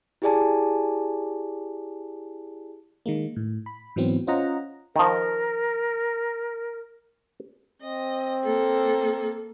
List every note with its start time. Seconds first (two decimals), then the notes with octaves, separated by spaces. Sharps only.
0.22 E4 G4 G#4 D5 G#5 A5
3.06 D#3 G#3 A#3
3.36 A2
3.66 B5
3.96 G#2 E3 F#3 B3 C4
4.27 C#4 F4 C5 D#5 F#5 A#5
4.96 D#3 F3 A#4
7.82 C4 D#5
8.44 A#3 A4